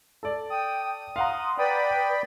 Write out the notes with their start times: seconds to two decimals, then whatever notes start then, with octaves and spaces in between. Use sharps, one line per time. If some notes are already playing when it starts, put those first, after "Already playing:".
0.23 A4 D5
0.50 G5 D#6
1.16 F5 F#5 A#5 C6
1.58 B4 D5 G5 B5 D#6